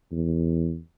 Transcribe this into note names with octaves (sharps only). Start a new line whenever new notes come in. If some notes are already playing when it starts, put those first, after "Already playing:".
E2